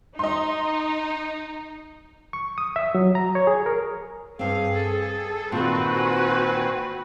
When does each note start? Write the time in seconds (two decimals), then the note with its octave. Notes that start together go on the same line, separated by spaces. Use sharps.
0.19 D#4 D#5 C6
2.33 C#6
2.58 D#6
2.76 E5
2.95 F#3
3.15 A#5
3.35 C#5
3.47 G#4
3.66 A#4
4.39 G2 C4 G#4 F5
4.74 A4
5.52 A#2 D#3 C4 F#4 B4
5.94 G#5